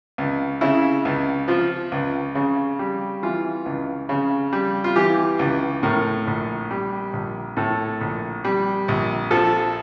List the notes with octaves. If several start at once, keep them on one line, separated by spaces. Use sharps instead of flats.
C#2
C#3 E4
C#2
F3 F4
C#2
C#3
G3
E3 F4
C#2
C#3
G3
F4
E3 G4
C#2
A2 A#4
A#1
G3
A#1
A2 A4
A#1
G3
A#1
F3 A4